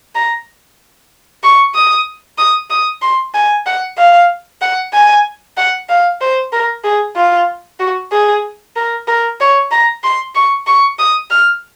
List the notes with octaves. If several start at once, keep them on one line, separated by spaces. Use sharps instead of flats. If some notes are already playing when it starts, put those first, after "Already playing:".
A#5
C#6
D#6
D#6
D#6
C6
G#5
F#5
F5
F#5
G#5
F#5
F5
C5
A#4
G#4
F4
F#4
G#4
A#4
A#4
C#5
A#5
C6
C#6
C#6
D#6
F6